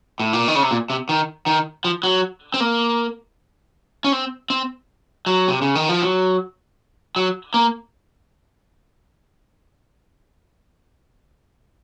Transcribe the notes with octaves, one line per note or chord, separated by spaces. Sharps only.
A2
A#2
D#3
C#3
C3
A#2
C3
D#3
D#3
F3
F#3
C4
A#3
C#4
C4
C4
F#3
C3
C#3
D#3
F3
F#3
F#3
A#3